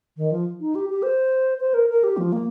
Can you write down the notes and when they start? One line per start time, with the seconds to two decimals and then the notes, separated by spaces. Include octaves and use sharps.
0.17 D#3
0.31 F3
0.61 D#4
0.75 G4
0.90 G4
1.03 C5
1.60 C5
1.74 A#4
1.90 A#4
2.04 G4
2.17 F3
2.33 A#3